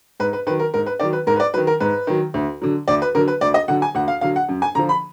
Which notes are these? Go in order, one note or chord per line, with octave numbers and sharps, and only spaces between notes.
G#2 B4
B4
D#3 F#3 B4
A#4
G#2 A#4
B4
D#3 F#3 D5
B4
G#2 A#4
B4
D5
D#3 F#3 B4
A#4
G#2 B4
D#3 F#3
D2
D3 F#3
D2 D5
B4
D3 F#3 A#4
B4
D2 D5
D#5
D3 F#3 F#5
G#5
D2 F#5
F5
D3 F#3 F5
F#5
F#2
G#5
D3 F3 A#5
B5